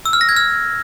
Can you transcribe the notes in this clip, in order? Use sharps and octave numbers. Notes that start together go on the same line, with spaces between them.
E6
F6
A#6
G#6
F6